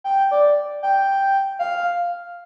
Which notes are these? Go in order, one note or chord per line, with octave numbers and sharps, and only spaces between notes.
G5
D5
G5
F5